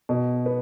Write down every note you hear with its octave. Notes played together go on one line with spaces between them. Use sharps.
B2
B3